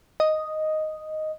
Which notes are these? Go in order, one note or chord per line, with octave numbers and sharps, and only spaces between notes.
D#5